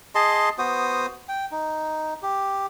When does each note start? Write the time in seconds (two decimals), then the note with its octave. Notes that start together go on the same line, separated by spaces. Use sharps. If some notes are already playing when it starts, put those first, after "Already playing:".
0.15 G#4 D#5 A5 C6
0.59 B3 F#4 C5 D#6
1.28 G5
1.52 D#4
2.22 G4